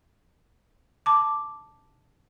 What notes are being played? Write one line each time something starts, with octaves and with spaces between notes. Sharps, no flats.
A5 D6